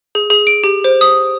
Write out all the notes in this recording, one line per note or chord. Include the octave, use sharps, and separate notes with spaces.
G#4
G#4
D7
G4
C5
D#6